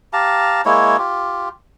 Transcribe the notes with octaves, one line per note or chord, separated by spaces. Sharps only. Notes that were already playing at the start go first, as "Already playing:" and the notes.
G4 F5 A5 A#5
G#3 A#3 E4 C#5
F4 G4